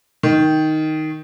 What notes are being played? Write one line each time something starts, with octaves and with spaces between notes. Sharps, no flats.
D#3